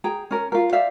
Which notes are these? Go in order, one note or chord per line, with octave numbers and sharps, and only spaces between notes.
G#4 G5 A#5
C#4 A#4
F4 A#4
C5 D5 E5 F5